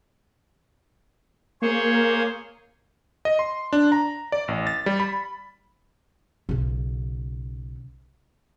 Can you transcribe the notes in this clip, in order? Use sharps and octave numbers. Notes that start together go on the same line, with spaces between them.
A#3 G#4 C5 C#5
D#5
C6
D4
A#5
D5
A1
A6
G3
B5
B1 C#3